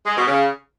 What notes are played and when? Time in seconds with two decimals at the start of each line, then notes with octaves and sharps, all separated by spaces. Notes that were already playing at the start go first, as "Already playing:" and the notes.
0.06 G#3
0.16 B2
0.27 C#3